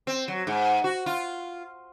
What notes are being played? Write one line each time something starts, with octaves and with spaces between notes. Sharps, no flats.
C4
F#3
G#2
F#4
F4